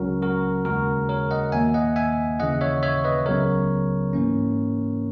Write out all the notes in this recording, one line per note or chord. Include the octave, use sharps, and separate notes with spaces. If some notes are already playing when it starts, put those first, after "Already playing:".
Already playing: C#2 C#3 F#3 C#4 F#4 A#4
F#4 A#4
D#2 C#3 G#3 F#4 A#4
A#4 C#5
D#5 F#5
D#2 D#3 A#3 E5 G#5
D#5 F#5
E5 G#5
D#2 C#3 E3 D#5 F#5
C#5 E5
C#5 E5
B4 D#5
C#2 C#3 F#3 B3 A#4 C#5
G#2 E3 A#3 C#4